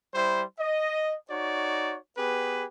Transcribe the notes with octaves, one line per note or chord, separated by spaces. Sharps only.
G3 E4 C5
D#5
D#4 F#4 C#5 D5
B3 G4 G#4 B4